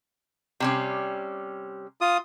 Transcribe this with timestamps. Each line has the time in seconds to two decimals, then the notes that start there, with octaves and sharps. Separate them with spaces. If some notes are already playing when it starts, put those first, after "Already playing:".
0.60 C3 G3 C#4
2.01 F4 D#6